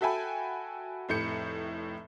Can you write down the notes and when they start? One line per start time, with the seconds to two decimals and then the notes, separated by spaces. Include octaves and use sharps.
0.01 F#4 A4 E5 G5 G#5 B5
1.09 F1 A2 G6 C#7